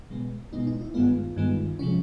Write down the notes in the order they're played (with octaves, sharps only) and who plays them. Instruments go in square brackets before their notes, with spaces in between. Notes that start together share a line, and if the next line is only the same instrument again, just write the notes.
[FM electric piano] B2 G#3 B3
B2 G#3 B3 D#4
D#4
E4
G2 D#3 G#3 B3 F4
G2 D#3 G#3 B3
C3 F3 G#3 C#4